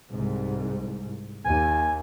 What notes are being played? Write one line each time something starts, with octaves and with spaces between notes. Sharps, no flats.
C2 G#2
D#2 G#5